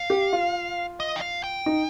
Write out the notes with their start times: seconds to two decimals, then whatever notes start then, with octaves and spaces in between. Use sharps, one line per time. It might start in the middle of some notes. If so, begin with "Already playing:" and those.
Already playing: F5
0.10 G4
0.33 F4
1.00 D#5
1.16 G5
1.21 F5
1.44 G5
1.66 D#4